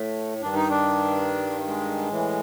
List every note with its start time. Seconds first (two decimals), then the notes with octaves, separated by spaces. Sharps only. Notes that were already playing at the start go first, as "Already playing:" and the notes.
Already playing: A2 A3
0.42 G2 D#3 D4
0.56 D#4
0.70 D4
1.67 G#3
2.09 A2 E3